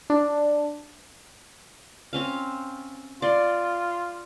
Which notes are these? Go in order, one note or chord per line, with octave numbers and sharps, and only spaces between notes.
D4
C4 C#4 F5
F4 D5 C6